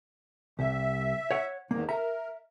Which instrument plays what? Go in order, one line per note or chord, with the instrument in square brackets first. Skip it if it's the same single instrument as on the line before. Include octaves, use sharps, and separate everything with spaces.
[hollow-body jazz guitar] C2 [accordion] E5
[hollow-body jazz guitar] C#5 F#5
[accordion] E2 G#2 D#3 [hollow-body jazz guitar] A#3
[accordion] A#4 [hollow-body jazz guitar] E5 A#5